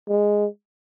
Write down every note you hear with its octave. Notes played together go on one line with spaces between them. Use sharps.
G#3